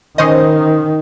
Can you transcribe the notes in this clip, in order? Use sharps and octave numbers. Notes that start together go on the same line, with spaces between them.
D#3 C#4 C5 D#5